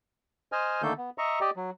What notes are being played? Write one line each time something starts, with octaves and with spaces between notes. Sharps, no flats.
C5 D#5 G#5 F6
D3 D#3 A3 A#3 A4 G6
B3
D#5 E5 A#5 C#6
G4 D5 D#5
F#3